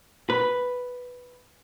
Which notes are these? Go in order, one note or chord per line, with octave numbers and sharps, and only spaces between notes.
B4